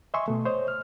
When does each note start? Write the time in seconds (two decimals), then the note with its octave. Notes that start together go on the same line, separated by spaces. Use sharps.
0.14 D#5 E5 G#5 C6 C#6
0.28 B2 A3
0.45 C5 C#5 D#5
0.68 F6